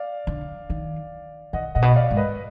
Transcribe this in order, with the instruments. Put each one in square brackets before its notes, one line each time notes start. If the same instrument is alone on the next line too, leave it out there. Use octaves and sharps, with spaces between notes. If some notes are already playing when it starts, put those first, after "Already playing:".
Already playing: [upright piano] D5 F5
[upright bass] D3
D#3
[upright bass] D#3 [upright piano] D#5 F#5
[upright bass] A#2 [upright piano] D#5 F#5
[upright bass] B2
[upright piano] D5 F5
[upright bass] G#2
[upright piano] B4 D#5